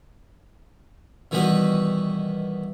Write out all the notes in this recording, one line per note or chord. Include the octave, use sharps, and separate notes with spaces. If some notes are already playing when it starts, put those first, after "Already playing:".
B2 D#3 E3 G3 B3 F#4